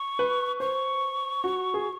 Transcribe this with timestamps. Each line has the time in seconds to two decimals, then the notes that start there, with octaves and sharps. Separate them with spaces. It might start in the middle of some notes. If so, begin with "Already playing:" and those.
Already playing: C#6
0.19 B4
0.60 C5 C#6
1.44 F#4
1.74 G#4